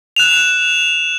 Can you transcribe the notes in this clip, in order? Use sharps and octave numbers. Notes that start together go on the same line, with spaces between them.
F#6 E7 F7